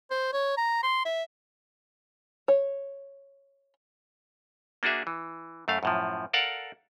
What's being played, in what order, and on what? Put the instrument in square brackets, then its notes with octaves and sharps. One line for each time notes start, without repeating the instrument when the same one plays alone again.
[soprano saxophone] C5
C#5
A#5
C6
E5
[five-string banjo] C#5
[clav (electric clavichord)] A#3 D4 F#4 G#4 E5
E3
F#2 A3 F5
F#2 A2 F3
A4 A#4 D5 F5 F#5